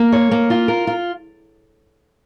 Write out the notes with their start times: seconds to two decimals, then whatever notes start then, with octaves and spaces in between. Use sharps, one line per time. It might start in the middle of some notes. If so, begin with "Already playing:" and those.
Already playing: A#3
0.12 C#5
0.31 A#3
0.50 F4
0.68 A#4
0.87 F4